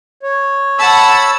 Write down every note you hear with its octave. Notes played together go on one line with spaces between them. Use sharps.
C#5
F#5 A5 B5 E6